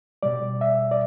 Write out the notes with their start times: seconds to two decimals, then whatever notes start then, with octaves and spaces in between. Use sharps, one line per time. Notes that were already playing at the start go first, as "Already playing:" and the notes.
0.23 B2 G3 D5
0.61 E5
0.91 D5